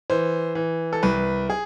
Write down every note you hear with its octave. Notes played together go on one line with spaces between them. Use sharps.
E3 C5
E3
A4
C2 B4
G#4